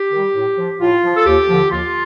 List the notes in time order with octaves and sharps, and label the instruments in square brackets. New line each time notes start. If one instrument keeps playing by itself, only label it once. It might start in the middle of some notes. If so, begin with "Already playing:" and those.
Already playing: [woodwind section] G4
D#3 G3
A2
F3
A2 F4
F3
A4
D#2 G4
D3 F3
D#2 F4